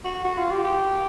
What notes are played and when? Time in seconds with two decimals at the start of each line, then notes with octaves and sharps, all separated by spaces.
0.04 F#4
0.24 F#4
0.38 F4
0.51 G4
0.64 G4